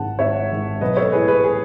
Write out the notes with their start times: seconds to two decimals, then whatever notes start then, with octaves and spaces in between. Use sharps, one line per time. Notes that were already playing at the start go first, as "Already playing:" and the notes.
Already playing: G#1 G#2 D#3 F#5 A5
0.19 G#1 C#5 E5
0.50 G#2 D#3
0.81 B1 B4 D#5
0.97 A4 C#5
1.12 A2 E3 G#4 B4
1.28 G#4 B4
1.44 G#4